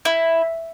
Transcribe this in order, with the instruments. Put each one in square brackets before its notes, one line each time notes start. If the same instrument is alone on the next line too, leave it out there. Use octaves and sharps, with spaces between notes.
[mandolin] E4